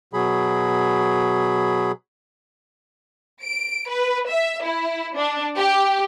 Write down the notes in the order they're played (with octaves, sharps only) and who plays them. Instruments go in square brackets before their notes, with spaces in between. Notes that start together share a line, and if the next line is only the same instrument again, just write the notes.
[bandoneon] B2 F#3 G#4 B5
[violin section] D7
B4
E5
E4
D4
G4